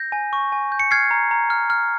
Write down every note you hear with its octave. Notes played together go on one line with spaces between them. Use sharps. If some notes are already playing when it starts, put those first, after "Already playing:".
Already playing: G6 A#6
G#5
C#6
G#5
G6
C#7
F6 G#6 C7
A#5
A#5
F6
F6